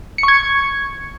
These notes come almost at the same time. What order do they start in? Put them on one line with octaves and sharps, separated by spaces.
C#7 C#6 G#6